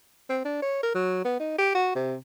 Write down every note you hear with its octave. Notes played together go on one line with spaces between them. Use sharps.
C4
D4
C#5
A#4
F#3
B3
D#4
G4
F#4
C3